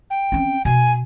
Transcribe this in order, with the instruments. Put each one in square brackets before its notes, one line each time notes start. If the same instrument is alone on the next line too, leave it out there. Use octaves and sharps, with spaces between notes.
[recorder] G5
[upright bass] C4 C#4
[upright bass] B2 [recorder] G#5